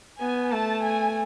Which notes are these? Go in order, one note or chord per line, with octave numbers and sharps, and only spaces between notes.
B3 G#5
A3 A5
G#5